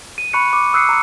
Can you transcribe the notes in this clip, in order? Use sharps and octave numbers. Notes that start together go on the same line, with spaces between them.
D#7
B5 C#6 F#6 C#7
D6
D#6 E6 F#6 C7 C#7
A#5 C#7